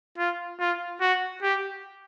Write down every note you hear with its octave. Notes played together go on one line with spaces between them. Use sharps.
F4
F4
F#4
G4